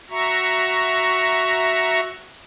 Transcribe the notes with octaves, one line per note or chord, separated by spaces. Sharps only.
F#4 E5 A#5 C#6